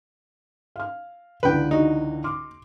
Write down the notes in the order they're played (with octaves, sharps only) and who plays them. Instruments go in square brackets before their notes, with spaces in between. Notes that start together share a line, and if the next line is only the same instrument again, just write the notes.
[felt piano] F5 F6
[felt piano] C#2 D3 E3 [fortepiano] B4 G5
[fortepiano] D#4 F#4
[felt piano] C6 D6 F6